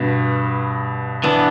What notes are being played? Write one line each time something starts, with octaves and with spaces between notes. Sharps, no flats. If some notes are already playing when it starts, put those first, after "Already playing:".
Already playing: G2 B2
E3 B3 D4